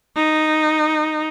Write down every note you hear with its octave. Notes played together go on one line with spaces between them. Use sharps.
D#4